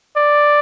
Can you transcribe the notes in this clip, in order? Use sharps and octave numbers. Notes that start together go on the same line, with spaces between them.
D5